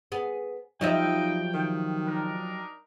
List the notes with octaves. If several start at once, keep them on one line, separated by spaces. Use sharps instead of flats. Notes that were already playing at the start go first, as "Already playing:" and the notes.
B3 G#4
F3 F#3 D#4 G4 D#5 E5 G5
D#3
D4 D#4 A#4